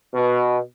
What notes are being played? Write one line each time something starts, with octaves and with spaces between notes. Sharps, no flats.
B2